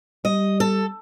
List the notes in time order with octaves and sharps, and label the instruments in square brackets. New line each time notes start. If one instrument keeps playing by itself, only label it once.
[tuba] G3 [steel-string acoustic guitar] D#5
[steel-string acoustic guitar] A4